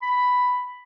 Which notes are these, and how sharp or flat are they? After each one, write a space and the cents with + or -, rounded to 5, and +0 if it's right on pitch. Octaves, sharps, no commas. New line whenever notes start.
B5 +5